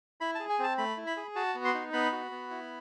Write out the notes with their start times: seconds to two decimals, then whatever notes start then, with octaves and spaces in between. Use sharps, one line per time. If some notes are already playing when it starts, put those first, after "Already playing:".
0.21 E4 B5
0.35 G#4 A5
0.49 G#5
0.59 C4 A5
0.78 A3 B5
0.97 E4
1.07 B5
1.17 G#4
1.35 F#4 A5
1.55 B3
1.65 C6
1.74 D#4
1.93 B3 B5
2.12 F#4
2.31 B3
2.50 E4